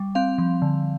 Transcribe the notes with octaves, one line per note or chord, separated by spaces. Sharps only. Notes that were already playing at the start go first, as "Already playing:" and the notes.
Already playing: G3
C4 F5
F3
D3